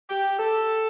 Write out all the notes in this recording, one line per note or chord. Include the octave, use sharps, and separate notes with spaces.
G4
A4